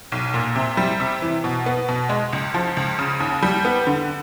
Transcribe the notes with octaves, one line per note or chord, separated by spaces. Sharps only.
B1
A#2
C3
G3
C3
E3
B2
B3
B2
G#3
C#2
F3
C#2
C#3
D#2
G3
B3
D3